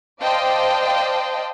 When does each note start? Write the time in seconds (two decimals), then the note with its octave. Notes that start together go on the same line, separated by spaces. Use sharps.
0.22 C5 D5 D#5 F5 G5 A5